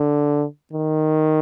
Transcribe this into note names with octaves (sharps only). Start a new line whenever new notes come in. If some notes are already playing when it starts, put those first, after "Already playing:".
Already playing: D3
D#3